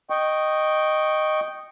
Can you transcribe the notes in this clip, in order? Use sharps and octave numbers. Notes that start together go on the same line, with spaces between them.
D#5 G5 C#6